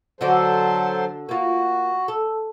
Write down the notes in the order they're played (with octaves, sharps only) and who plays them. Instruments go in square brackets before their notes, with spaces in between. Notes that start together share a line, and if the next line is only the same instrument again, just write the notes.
[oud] D3 F#4 D5 [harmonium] F#3 A4 C5
[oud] A#3 F4 [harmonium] F#4
[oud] A4